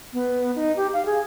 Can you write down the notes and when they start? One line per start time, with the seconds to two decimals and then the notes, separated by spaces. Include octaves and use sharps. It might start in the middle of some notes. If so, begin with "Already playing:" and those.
0.13 B3
0.55 D#4
0.76 G4
0.93 F5
1.06 G#4